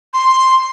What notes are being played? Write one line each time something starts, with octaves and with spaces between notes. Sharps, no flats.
C6